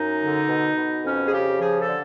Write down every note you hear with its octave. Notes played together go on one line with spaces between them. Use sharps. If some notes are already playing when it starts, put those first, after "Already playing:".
Already playing: F#2 D#4
D3
B2
B2
F2 C#4
G#4
C#3 G4
F3 G#4
A4
D3